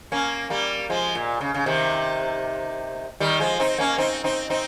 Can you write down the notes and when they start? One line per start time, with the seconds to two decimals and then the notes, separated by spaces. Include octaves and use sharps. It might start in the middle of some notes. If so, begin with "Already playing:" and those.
0.12 A#3 C#4
0.50 G3 A#3
0.90 F3 G#3
1.15 A#2
1.41 C#3
1.54 C#3
1.66 C3 D#3
3.20 D#3 G3
3.40 F3 G#3
3.60 C4 D#4
3.78 A#3 C#4
3.98 C4 D#4
4.24 C4 D#4
4.50 C4 D#4